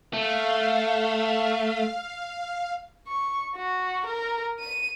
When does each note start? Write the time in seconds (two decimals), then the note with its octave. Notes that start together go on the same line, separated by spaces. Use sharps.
0.13 A3 F5
3.07 C#6
3.56 F#4
4.06 A#4
4.59 D#7